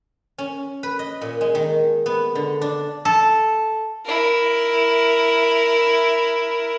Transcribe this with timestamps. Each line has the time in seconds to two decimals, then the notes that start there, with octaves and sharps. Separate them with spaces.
0.38 C#4
0.83 B4
0.99 D#5
1.21 A#2
1.41 G#3
1.55 D#3
2.06 B3
2.35 D3
2.62 D4
3.05 A4
4.05 E4 A#4